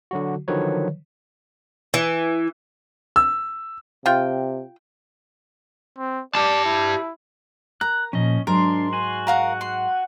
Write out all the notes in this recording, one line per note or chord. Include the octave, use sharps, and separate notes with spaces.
D3 F#3 F#4
D3 D#3 F3 F#3 B4 C#5
E3
E6
C3 F4 G5
C4
G4 D5 A5
E4
A#4 A#5 F#6
A#2 F3 C#4 D#5
G#2 F#3 D4 G#4 A#4 C6
F#4 G#5
A#4 F5 F#5 A#5
C6